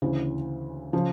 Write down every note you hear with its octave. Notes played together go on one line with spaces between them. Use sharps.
D2 C#3 E3
C#3 F3